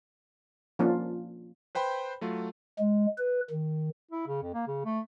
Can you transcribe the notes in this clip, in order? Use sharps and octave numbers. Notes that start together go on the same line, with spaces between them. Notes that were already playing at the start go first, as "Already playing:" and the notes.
F3 A#3 C#4 D4 F4
B4 C5 G5 B5 C6
F#3 A3 F4
G#3
B4
D#3
E4
C#3
F2
A#3
C#3
A3